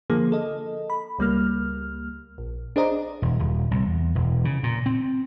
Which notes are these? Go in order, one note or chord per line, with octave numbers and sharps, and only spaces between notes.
D3 F3 A#3 G#4
A4 D#5
B5
C#2 G3 A#3 F6
A#1
D4 G#4 C5 D5 D#5 A#5
E1
D#1
C2
E2
E1
C#3
A#2
C4